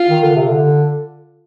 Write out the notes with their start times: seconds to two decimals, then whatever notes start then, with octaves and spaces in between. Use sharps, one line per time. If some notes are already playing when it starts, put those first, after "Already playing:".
Already playing: F4
0.09 D#3
0.23 D3
0.36 C3
0.49 D3